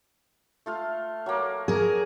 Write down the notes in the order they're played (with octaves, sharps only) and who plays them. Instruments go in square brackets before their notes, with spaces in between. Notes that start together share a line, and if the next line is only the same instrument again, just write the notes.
[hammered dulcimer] A3 F4 F5
F#3 A#3
[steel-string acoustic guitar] G#4 A#4